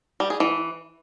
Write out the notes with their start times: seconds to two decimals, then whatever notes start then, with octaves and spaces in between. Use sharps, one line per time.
0.20 G3
0.30 G#4
0.40 E3